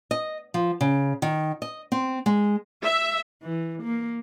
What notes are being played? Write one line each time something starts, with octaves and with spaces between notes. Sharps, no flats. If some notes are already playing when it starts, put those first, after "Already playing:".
D#5
F3
C#3
D#3
D#5
C4
G#3
E5
E3
A#3